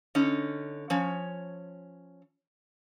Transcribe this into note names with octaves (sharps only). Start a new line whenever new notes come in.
D3 C#4 D#4
F3 C#4 C#5